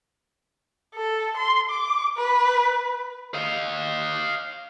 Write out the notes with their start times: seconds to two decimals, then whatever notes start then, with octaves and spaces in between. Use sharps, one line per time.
0.95 A4
1.37 C6
1.70 D6
2.17 B4
3.34 D#5 F5